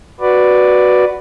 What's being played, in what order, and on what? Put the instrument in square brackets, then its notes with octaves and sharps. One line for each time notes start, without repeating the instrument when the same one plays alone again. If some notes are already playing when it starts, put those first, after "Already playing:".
[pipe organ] F#4 B4 D5